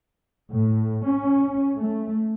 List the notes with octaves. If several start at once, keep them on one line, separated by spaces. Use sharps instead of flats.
A2
C#4
A3